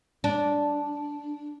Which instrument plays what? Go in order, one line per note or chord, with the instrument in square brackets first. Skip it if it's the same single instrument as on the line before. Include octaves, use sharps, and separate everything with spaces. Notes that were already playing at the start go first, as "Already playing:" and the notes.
[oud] D4